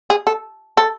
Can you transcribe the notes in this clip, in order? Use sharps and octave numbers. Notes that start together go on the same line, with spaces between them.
G#4
A4
A4